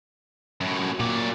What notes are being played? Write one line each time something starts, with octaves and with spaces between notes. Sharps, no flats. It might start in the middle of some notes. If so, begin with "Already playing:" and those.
F#2 A2
A#2 F#3 D5